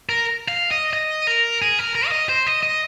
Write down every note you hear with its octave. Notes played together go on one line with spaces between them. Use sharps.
A#4
F5
D#5
D#5
A#4
G#4
A#4
A#4
F5
D#5
C5
D#5
D#5